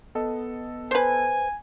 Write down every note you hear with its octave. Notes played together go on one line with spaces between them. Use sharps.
B3 A4 D#5
B4 C5 G#5